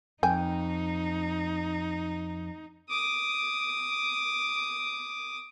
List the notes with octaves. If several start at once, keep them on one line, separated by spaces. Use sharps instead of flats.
F2 D#4 G5 G#5
D6 D#6